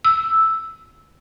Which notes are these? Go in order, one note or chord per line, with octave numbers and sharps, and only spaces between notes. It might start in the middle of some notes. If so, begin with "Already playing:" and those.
E6